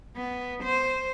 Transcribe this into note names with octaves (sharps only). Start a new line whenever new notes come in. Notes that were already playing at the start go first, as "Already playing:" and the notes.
B3
C5